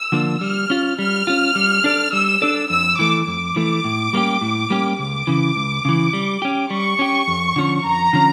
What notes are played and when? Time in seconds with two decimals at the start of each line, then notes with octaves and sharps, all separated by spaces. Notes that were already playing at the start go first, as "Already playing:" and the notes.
Already playing: E6
0.12 D3 F3 A#3 D4
0.41 G3 F6
0.70 C#4 F4
0.98 G3 F6
1.27 C#4 F4
1.55 G3
1.84 D4 A4 D5
2.13 G3 E6
2.42 D4 A4 D5
2.70 F2 E6
2.99 E3 A3 D6
3.27 F2 D6
3.56 E3 A3
3.84 A2
4.13 G3 A#3 C#4 G4
4.41 A2
4.70 G3 A#3 C#4 G4
4.99 C#2 D6
5.27 C#3 E3
5.56 C#2
5.85 C#3 E3
6.13 G3
6.42 C#4 G4
6.70 G3 C#6
6.99 C#4 G4
7.28 F2
7.56 D3 F3 C#4
7.85 F2 A#5
8.13 D3 F3 C#4